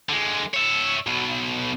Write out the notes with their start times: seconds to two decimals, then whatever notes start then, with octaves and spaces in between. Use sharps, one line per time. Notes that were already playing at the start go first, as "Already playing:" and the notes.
0.09 D3 G#3
0.54 C#5 E5
1.07 B1 B2